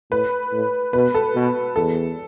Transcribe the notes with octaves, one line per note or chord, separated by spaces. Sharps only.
A2 B4
A2
B2 B4
A4
B2
E2 A4